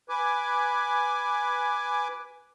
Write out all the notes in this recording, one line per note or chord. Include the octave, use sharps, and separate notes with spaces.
B4 G#5 D6